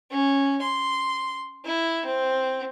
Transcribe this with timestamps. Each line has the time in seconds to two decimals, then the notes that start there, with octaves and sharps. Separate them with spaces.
0.11 C#4
0.62 C6
1.65 E4
2.06 C4